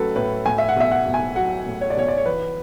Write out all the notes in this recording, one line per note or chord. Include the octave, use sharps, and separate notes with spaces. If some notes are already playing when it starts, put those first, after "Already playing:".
Already playing: A2 F#3 A3 C#4 A4 B4
A2 B4
A2 G#5
E5
F#5
B1 E5
F#5
B1
G#5
F#3 F#5
A2
C#5
D5
B1 C#5
D5
C#5
E3 B4